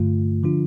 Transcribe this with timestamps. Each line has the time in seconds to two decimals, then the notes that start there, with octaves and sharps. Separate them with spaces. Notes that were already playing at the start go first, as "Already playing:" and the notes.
Already playing: G2 D3 A3 F4
0.43 D3 F3 D4 F4